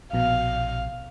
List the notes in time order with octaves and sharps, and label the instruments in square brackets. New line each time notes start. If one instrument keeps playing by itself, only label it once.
[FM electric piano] A#1 B2 [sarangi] F5